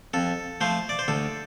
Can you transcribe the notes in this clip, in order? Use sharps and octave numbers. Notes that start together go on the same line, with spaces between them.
F2 A4
F3 A3 C5
D5
C5
D2 A4